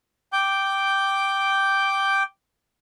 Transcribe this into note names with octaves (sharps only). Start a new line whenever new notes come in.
G5 D6 G6